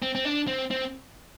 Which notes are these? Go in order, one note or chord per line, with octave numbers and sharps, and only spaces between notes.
C4
C4
D4
C4
C4